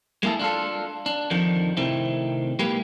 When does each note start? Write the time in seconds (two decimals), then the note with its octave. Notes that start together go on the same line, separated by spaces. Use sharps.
0.23 G#3 A#3 E4 G#4 A4
0.39 D4 F4 A4
1.06 D4
1.31 F2 D3 D#3 F3
1.77 A2 C3 D#3 C4 E4
2.59 B1 G#3 A#3 G4 B4